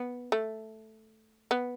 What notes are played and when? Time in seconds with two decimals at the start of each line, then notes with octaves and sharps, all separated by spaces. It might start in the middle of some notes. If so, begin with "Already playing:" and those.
Already playing: B3
0.32 A3
1.51 B3